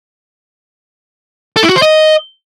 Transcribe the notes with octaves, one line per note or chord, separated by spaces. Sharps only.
A4
E4
F#4
C5
D#5